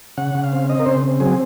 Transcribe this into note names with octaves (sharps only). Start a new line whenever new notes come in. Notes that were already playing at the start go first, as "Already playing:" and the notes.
C#3 F#5
C#3
F5
C4
C4 D#5
A#4
C#3 C5
C4
F#3 G#4